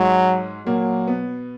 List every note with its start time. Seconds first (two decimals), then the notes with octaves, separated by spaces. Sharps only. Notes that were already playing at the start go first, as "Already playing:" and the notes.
Already playing: G#2 F#3 G#3
0.66 A#2 F#3 A#3
1.07 B2 B3